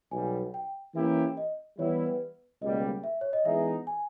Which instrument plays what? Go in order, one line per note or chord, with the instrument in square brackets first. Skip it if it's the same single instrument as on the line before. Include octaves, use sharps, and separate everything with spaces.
[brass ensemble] B1 B2 G3 [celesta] G#5
[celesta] G5
[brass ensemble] E3 A#3 C#4 E4 G4 [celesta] E5
[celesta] D#5
[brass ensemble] E3 G3 B3 E4 [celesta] C#5
[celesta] B4
[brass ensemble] C#2 B2 G3 A#3 [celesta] D#5
[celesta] E5
C#5
D#5
[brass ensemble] E3 G#3 B3 D#4 G#4 [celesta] E5
[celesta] G#5